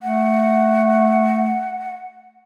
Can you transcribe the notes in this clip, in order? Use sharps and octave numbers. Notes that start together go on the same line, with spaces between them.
A3 F#5